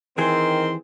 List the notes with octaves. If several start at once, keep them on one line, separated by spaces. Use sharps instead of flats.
D#3 E3 C4 G#4 C6